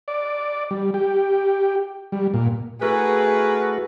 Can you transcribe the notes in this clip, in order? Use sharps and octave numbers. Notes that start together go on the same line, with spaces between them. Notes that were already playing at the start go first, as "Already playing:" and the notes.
D5
G3
G4
G3
A#2
A3 E4 F#4 G#4 A#4 B4